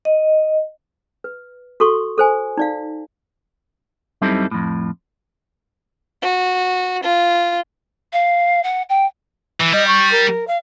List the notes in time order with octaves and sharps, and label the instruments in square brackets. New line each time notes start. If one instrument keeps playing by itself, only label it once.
[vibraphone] D#5
[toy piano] B4
F#4 A4 C6 C#6
A4 C5 G#5
D#4 D5 F5
[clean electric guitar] F#2 G3 C4 D#4 E4 A4
F2 A2
[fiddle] F#4
F4
[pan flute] F5
F#5
G5
[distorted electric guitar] E3
[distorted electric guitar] G3 [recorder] D#5
[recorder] C#6
A#4
F5